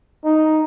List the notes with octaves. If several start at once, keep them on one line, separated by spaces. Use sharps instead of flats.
D#4